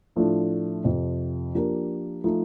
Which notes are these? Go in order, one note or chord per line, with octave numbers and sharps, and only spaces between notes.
A2 F3 A3 D4
F2 C3 F3
F3 A#3 D4 G4 A#4
F3 A3 D#4